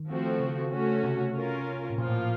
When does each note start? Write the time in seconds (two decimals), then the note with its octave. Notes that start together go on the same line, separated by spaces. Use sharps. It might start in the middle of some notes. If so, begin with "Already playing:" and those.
Already playing: D#3
0.08 F3 A3 C4 F#4
0.40 C#3
0.72 A3 C#4 F#4
1.04 C3
1.35 C#4 F4 A#4
1.90 A2
1.98 A#2 F3 A#3 F4
2.09 A2